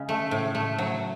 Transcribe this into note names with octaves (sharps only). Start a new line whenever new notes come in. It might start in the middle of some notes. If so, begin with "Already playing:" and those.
Already playing: C#3 G#3
A3
A2
A3
F#3